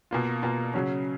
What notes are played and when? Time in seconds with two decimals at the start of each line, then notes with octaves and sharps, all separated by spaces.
0.11 B2 A#3 F4
0.42 B2 A#3 F4
0.74 C#3 F#3 C#4